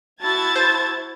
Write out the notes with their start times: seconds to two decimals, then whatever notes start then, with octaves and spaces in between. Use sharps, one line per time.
0.22 E4 F#4 A5 G#6 A6
0.56 C5